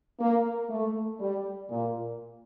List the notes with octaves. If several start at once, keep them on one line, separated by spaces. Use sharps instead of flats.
A#3
A3
G3
A#2